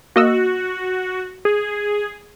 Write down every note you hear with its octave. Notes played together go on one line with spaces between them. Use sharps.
A#3 F#4 D#5 E6
G#4